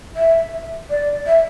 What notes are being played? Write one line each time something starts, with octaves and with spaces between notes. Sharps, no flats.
E5
D5
E5